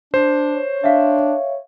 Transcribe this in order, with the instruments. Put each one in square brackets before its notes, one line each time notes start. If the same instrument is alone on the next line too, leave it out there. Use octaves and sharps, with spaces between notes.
[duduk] D4 [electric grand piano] C5
[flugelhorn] C#5
[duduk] D4 [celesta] E5 F5